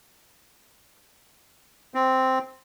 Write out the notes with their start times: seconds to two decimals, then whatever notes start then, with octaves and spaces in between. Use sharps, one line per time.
1.94 C4